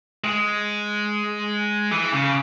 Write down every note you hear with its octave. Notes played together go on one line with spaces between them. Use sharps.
G#3
E3
C#3